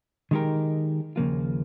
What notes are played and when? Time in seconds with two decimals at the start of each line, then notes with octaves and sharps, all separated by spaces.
0.31 D#3 G#3 D#4 G4 A#4
1.16 D#2 C#3 F3 A#3 F4